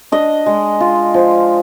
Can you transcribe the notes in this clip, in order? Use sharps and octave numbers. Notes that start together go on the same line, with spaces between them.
D4 D#5
G#3
F4
F3